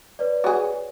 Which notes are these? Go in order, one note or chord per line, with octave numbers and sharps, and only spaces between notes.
B4 C#5 D5
F#4 G#4